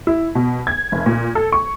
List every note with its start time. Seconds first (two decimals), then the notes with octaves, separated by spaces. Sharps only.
0.07 E4
0.35 B2
0.67 G#6
0.92 F1
1.06 A#2
1.35 A4
1.52 C#6